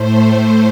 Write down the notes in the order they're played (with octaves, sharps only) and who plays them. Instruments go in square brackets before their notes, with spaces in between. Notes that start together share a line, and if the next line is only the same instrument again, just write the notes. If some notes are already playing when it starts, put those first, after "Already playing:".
Already playing: [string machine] A2 A3 C5